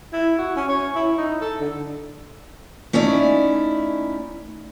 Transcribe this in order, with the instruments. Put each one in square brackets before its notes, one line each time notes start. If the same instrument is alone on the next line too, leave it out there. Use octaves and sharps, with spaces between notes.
[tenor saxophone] E4
F#4
C#4
C#5
E4
D#4
A4
D3
[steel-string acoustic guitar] A3 C#4 D#4 E4 D5